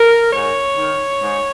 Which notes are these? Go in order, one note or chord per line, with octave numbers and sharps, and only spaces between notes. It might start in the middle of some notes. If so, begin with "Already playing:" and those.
Already playing: A#4
G#2 C#5
D#3
G#2